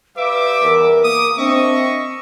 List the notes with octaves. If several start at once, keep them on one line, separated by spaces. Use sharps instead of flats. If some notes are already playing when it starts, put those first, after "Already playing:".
G3 B4 E5 F5 D6
E2 A#4
A#3 D6 D#6
C4 D4 D#5 E5 C#6